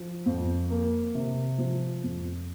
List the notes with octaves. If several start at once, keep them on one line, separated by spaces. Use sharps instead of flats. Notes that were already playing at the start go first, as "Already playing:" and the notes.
Already playing: F3
F2
A#3
C3
F3
F2